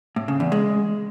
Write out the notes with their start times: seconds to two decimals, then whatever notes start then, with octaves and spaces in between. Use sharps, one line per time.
0.16 A2
0.28 C#3
0.40 E2
0.52 G#3